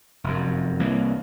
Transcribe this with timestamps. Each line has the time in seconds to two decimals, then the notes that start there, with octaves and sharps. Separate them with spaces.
0.24 F1 F#2
0.80 C2 E3 A#3